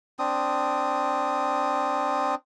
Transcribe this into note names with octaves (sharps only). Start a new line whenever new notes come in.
C4 D4 D#6